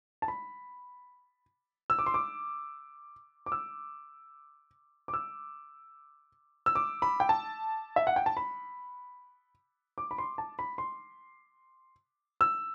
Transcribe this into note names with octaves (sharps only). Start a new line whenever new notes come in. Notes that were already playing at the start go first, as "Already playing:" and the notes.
A5
B5
E6
D6
C6
D6
D6
E6
D6
E6
E6
D6
B5
G5
A5
E5
F#5
G5
A5
B5
D6
B5
C6
A5
B5
C6
E6